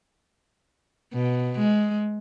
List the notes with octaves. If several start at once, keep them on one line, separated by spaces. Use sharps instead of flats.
B2
G#3